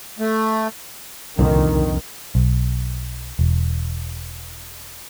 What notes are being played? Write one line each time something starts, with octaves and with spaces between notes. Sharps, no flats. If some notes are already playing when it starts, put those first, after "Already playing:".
A3
C2 F2 A#2 D3 D#3
B1
E1